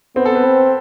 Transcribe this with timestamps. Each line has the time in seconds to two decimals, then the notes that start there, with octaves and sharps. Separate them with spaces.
0.16 B3 C4
0.25 A4
0.35 B4
0.45 C4